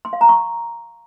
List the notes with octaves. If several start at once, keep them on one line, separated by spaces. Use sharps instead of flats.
C6
F5
A#5
C#6